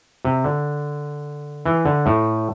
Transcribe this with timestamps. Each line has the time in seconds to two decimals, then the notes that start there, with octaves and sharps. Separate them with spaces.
0.25 C3
0.44 D3
1.66 E3
1.85 D3
2.06 A2